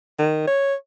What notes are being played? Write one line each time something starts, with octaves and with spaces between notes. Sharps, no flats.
D#3
C#5